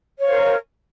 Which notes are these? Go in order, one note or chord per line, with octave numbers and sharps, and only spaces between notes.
A#4 C5 C#5 F5